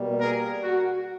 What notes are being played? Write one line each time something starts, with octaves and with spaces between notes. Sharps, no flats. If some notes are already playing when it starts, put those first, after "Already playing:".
Already playing: B2 G3 A#3
G#4 A#4
F#4